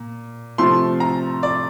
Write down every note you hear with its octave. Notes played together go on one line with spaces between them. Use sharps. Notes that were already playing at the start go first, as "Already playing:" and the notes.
Already playing: A#2
C3 F3 A3 C6
A#5
D5